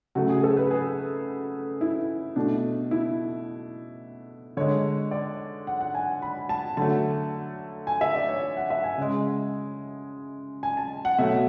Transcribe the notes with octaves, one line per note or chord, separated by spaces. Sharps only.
C#3 F#3 A3 F#4
G#4
A4
B4
G#4
E4
B2 A3 D4
E4
D3 G#3 C#5
D5
F#5
F#5
G#5
B5
A5
D3 F#3 A3 A5
G#5
E5
D5
C#5
F#5
E5
G#5
C#3 G#3
G#5
A5
F#5
B2 F#3 A3 E5